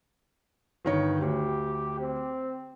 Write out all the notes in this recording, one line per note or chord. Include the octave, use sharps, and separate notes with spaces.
G1 D#3 C#5
D2 G4
C4